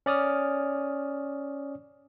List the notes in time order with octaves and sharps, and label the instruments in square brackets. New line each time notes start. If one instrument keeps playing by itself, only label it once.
[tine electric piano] C#4 D5 D#6 F6